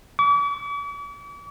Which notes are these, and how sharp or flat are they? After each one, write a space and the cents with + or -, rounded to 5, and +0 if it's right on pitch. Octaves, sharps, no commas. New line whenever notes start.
D6 -45